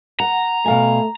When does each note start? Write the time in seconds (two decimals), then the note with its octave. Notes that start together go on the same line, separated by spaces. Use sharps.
0.20 F#5 A#5
0.66 B2 A3 F5 G#5